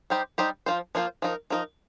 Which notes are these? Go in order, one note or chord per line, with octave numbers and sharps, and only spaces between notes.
G3 D#4 G4 C5
G3 D#4 G4 C5
F3 A#3 F4 C5
F3 A#3 F4 C5
F3 D#4 A#4
F3 D#4 A#4